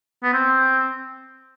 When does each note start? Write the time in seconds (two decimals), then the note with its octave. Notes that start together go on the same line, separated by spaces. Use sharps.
0.23 B3
0.33 C4